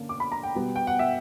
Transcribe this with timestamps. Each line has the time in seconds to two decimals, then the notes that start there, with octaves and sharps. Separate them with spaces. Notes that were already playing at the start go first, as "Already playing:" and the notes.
Already playing: D3 A#3 C#4
0.09 D6
0.20 B5
0.32 A#5
0.43 G5
0.55 B2 G3 B3
0.76 G5
0.87 F#5
0.99 E5